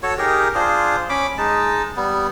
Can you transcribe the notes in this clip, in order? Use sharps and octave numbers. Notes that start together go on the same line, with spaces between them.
F#4 A4 C#5
D#4 G4 G#4 A#4
D4 F4 G#4 C5
C#4 B5 D6
G#3 D#4 A5
G3 B3